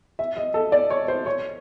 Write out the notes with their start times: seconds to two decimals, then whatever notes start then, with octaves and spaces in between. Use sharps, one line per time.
0.19 E5
0.37 D#5
0.54 A4
0.72 D5
0.90 C#5
1.08 C5
1.26 C#5